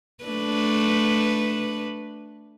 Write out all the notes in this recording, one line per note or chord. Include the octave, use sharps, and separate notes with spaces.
A3 D4 B4